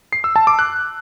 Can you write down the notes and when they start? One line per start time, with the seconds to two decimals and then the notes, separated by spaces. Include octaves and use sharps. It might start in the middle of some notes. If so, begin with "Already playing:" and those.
0.13 C7
0.24 E6
0.36 A5
0.47 D6
0.59 F#6